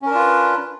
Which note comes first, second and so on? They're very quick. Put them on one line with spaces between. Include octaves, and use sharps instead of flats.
C#4 A#4 D4 F4 B4